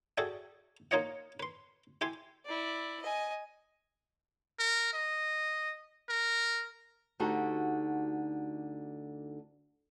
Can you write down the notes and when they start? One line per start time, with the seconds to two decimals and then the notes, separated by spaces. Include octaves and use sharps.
0.18 F#4 G#4 A4 D5 E5 G5
0.91 A#3 D#4 F4 C#5 D#5 F#5
1.40 B4 C6
2.01 E4 G4 G#5 C6
2.45 E4 D5
3.02 D#5 G#5
4.59 A#4
4.93 D#5
6.09 A#4
7.20 D2 D3 D#4 F#4 G4 A5